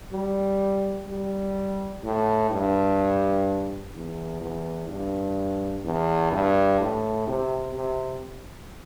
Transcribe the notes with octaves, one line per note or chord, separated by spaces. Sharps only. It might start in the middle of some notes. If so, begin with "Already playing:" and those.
G3
G3
A2
G2
E2
E2
G2
E2
G2
A2
C3
C3